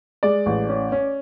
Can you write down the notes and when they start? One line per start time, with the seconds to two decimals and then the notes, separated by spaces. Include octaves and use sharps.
0.23 G#3 D5
0.46 A1
0.69 C#4
0.92 C#4